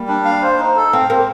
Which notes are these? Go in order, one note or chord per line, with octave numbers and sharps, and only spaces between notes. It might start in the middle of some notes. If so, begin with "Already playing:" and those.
Already playing: G3 A#3
D4
F5
C5
D#4
A4
C4 F5
A#3 C5